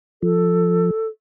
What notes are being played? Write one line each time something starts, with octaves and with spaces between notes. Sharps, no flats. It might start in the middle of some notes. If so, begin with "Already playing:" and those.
F3 A4